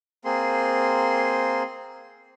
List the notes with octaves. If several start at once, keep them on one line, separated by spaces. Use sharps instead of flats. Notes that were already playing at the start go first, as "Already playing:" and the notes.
A#3 C4 G#4 C6